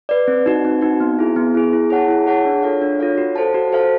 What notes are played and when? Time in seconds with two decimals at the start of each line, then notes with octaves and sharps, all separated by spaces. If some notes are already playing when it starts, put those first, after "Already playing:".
0.09 B4 D5
0.28 C4
0.46 D#4 F#4
0.65 C4
0.81 D#4 F#4
1.00 B3
1.19 E4 G#4
1.36 B3
1.55 E4 G#4
1.73 E4
1.90 G#4 C#5 F#5 A5
2.08 E4
2.26 G#4 C#5 F#5 A5
2.45 D4
2.63 F4 A4 C#5 F5
2.82 D4
2.99 F4 A4 C#5 F5
3.18 F#4
3.36 A4 C5 F5 A5
3.54 F#4
3.72 A4 C5 F5 A5